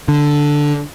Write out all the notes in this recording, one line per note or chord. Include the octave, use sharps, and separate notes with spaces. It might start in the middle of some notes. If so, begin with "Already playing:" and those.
D3